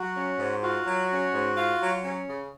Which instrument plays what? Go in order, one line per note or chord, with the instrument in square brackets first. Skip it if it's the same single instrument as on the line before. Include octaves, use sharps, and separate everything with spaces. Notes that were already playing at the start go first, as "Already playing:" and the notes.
Already playing: [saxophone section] F#3 [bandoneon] F#4
[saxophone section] C#4
G#2
[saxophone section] F4 [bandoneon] F#4
[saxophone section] F#3
C#4
G#2
F4
F#3
C#4
C#3